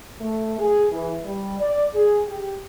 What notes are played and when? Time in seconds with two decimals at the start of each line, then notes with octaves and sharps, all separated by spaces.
0.21 A3
0.59 G#4
0.91 E3
1.25 G3
1.60 D5
1.94 G#4
2.28 G4